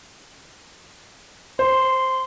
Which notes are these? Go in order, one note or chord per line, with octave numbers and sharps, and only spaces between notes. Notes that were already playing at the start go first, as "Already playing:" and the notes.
C5 C6